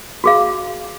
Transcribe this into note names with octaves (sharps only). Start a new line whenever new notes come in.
F#4 G#4 F5